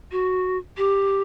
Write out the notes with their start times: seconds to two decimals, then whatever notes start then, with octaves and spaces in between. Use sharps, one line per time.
0.11 F#4
0.77 G4